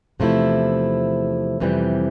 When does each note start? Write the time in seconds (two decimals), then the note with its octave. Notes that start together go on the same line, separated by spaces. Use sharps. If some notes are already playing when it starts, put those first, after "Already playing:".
0.20 E2 C3 F3 A3 E4
1.60 F2 C3 E3 G3